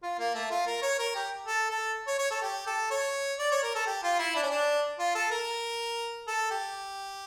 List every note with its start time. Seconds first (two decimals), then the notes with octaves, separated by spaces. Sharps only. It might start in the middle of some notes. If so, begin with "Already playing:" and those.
0.03 F4
0.19 A#3
0.34 A3
0.51 F4
0.67 A#4
0.82 C#5
0.99 A#4
1.15 G4
1.47 A4
1.71 A4
2.07 C#5
2.18 C#5
2.31 A4
2.42 G4
2.67 A4
2.91 C#5
3.39 D5
3.51 C#5
3.63 A#4
3.75 A4
3.87 G4
4.03 F4
4.19 E4
4.36 D4
4.43 C#4
4.50 D4
4.99 F4
5.15 A4
5.31 A#4
6.27 A4
6.51 G4